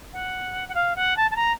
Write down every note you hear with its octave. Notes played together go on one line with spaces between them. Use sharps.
F#5
F#5
F5
F#5
A5
A5
A#5